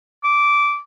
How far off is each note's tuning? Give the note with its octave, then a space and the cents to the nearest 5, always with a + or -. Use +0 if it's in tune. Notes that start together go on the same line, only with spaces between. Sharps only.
D6 -10